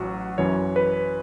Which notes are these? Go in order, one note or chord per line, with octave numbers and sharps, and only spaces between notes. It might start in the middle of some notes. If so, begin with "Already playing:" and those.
Already playing: A1 F#3 F#4
F#2 E3 C#5
B4